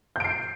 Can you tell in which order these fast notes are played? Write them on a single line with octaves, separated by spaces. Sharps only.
G6 D7 C7